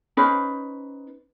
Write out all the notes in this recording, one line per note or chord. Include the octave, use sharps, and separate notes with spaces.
C#4 D#4 B4 C5